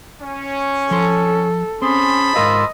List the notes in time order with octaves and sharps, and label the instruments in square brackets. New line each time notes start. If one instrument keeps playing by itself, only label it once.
[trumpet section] C#4
[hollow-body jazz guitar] F3 C6 [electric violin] A4
[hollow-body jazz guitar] C4 [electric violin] C#4 [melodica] G#4 C6 [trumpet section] C5 A5 B5
[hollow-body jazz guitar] G#2 A#4 F5 [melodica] F4 E6 [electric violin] D#5